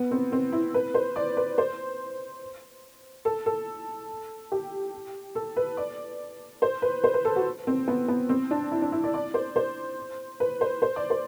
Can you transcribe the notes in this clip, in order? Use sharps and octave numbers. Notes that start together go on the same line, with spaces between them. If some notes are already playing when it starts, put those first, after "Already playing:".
Already playing: B3
C4
C4
E4
B4
C5
D5
B4
C5
A4
A4
G4
A4
B4
D5
C5
B4
C5
B4
A4
F#4
C4
B3
B3
C4
D4
E4
D4
E4
D5
D5
C5
C5
B4
C5
C5
D5
C5